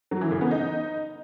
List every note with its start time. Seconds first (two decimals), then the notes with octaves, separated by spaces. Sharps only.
0.11 F#3
0.21 E3
0.31 C#3
0.41 B3
0.51 D#4